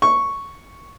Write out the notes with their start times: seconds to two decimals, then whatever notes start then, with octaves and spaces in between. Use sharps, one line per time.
0.02 C#6